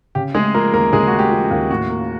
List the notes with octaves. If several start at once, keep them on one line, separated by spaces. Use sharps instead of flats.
C#3 G4
G#3 A3 G#4
F3 A#3 A#4
D#2 A#3 A#4
C#3 G#3 G#4
A3 F#4
G4
F3
G4
D#2
A2 F#4
A#3